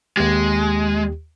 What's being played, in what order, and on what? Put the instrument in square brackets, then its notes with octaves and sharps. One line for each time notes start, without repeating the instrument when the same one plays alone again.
[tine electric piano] D#2 G4 [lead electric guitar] G#3